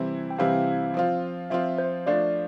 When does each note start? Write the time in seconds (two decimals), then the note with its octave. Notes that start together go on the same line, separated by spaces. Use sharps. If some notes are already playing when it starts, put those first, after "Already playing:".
Already playing: C3 E3 G3 C4 E4
0.30 G5
0.38 C3 E3 G3 C4 E4 F5
0.94 F3 C4 F4
1.50 F3 C4 F4 E5
1.78 C5
2.06 F3 A3 D4 F4 C5 D5